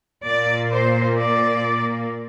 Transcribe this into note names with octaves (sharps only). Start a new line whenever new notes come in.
A#2 A#3 D5
C5
D5